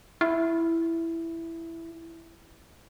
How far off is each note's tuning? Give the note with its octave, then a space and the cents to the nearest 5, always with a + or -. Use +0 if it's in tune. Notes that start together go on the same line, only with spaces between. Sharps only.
E4 +5